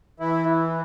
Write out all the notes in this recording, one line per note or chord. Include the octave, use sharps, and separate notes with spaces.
E3 E4